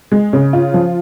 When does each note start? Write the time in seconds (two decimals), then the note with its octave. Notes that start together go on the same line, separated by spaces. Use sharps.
0.12 G#3
0.33 C#3
0.53 F4
0.74 F3